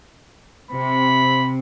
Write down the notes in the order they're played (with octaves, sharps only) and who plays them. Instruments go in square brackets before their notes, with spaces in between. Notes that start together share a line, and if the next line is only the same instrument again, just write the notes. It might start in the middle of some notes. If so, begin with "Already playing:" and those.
[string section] C3 [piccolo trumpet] B5